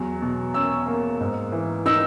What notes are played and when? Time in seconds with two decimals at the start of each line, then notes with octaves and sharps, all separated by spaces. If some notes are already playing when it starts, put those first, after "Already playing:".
Already playing: E2 F#3
0.22 B2
0.54 C#4 E6
0.87 A#3
1.20 G#2
1.52 E3
1.86 D#4 E6